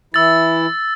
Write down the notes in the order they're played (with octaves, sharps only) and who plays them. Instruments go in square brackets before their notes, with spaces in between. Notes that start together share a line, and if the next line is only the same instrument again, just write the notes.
[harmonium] E3 E4 [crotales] E6 A6